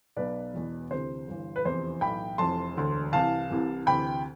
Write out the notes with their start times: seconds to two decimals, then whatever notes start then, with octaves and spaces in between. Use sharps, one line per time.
0.17 B1 B2 B4 D5
0.54 E1 E2 B2
0.91 D2 C3 E3 C5
1.27 G1 G2 E3
1.56 B4
1.65 F1 E2 C3 E3 C5
2.01 B1 A2 E3 G5 B5
2.38 F1 F2 E3 A5 C6
2.75 E1 D2 D3
3.12 C2 C3 E3 F5 A5
3.50 C2 C3 E3
3.86 D2 C3 E3 G5 B5